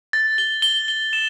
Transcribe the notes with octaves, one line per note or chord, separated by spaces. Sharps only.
A6
G7
G7
G7
E7